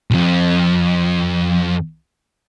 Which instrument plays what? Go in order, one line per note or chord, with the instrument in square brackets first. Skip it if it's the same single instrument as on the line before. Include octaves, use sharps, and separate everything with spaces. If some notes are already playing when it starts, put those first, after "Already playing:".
[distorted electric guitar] B1 F2